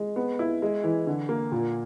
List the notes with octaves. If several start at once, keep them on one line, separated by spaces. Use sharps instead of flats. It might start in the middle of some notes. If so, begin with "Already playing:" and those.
Already playing: G#3
B3
E4
G#3
E3
D3
A#3
A#2